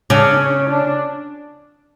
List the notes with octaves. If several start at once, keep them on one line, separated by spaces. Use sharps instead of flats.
C#3 D4
C#4
D4